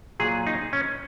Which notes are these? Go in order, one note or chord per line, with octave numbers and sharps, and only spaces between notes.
A#2 F#3 G#4
D#4
C#4